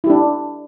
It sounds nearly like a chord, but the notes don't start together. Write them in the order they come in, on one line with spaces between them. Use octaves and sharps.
E4 G4 D4